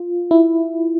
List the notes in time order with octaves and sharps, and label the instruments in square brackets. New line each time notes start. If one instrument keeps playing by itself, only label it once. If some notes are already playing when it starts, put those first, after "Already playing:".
Already playing: [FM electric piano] F4
E4